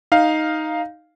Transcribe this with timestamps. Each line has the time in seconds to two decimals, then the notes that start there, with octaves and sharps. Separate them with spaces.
0.12 D#4 F5